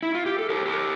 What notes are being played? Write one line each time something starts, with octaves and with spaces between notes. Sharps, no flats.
E4
F4
G4
A4
G4 A#4
G4 A#4